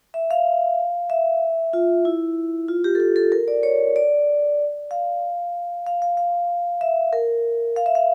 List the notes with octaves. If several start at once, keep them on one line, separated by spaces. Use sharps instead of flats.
E5
F5
E5
F4
E4
F4
G4
A4
G4
A4
A#4
D5
C#5
D5
F5
F5
F5
F5
E5
A#4
F5
E5
F5